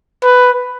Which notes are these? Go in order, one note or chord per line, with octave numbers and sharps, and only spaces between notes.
B4